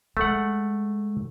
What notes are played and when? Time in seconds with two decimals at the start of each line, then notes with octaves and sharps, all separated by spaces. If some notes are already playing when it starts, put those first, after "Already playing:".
0.17 G#3 A3 F#5